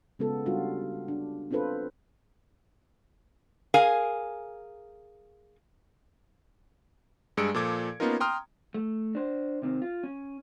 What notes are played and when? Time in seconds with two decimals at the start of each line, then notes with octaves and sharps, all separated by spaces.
0.19 C#3 G#3 B3 F4 A4
0.46 G3 C#4 D4 F4 F#4
1.08 D4
1.51 C4 D4 F4 A4 B4 C5
3.74 G#4 A#4 F5 G#5
7.37 G2 G#3 G#4 E6 C#7 D7
7.54 A#2 F3 A4 D6 G#6
8.00 A#3 B3 C#4 D#4 F4 A#4
8.20 G5 A#5 C6 D#6 F6
8.74 A3
9.15 D4 C5
9.62 C3 D#3 C4
9.82 F4
10.03 C#4